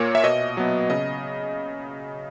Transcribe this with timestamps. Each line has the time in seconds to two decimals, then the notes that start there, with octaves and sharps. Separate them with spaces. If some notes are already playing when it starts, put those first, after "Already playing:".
Already playing: A#2 A#3 C#5
0.15 E5
0.23 B2 D#5
0.57 F#3 B3
0.90 C#3 D#5